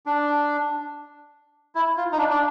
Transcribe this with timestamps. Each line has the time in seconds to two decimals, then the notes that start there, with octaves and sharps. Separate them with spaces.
0.06 D4
1.75 E4
1.97 F4
2.12 D#4
2.18 D4
2.30 D4